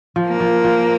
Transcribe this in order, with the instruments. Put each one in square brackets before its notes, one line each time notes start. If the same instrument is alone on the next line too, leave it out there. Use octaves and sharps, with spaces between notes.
[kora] F3
[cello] A#3
[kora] F3
F3